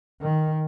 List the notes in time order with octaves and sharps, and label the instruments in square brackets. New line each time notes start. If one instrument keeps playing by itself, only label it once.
[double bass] D#3